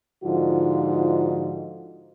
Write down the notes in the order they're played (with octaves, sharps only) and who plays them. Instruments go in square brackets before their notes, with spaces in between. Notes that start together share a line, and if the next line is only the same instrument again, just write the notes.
[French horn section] G#2 D3 F3 D#4 F4 F#4